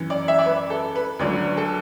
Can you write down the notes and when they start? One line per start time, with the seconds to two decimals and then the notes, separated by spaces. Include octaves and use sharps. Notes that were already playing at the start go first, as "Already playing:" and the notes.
Already playing: F#2 E3
0.10 D5
0.28 E5
0.39 D5
0.46 B4
0.70 A4
0.95 B4
1.19 D2 D3 F#3 D5
1.57 A4